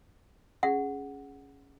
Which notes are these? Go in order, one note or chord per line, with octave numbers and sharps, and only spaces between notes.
C#4 G#4 F#5 A#6